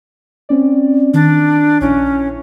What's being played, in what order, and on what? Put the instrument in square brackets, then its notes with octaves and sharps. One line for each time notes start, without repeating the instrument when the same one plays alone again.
[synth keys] C4 C#4 D5
[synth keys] D#3 A6 [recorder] D4
[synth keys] A#1 E4 [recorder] C#4